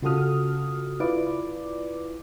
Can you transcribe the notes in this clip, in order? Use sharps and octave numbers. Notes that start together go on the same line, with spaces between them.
C#3 F4 F#4 A4 D#6 F6
E4 F4 B4 D5 D6